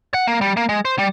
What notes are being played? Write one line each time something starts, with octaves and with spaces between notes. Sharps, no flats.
F#5
A#3
G3
A#3
G#3
C5
G3